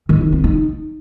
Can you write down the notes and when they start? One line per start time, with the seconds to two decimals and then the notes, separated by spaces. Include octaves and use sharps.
0.09 D#3
0.21 D#4
0.32 C4
0.44 D#4